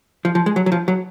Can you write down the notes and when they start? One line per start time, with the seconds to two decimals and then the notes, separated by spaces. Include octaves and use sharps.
0.25 F3
0.35 F3
0.46 G#3
0.56 F#3
0.66 F#3
0.72 F3
0.88 F#3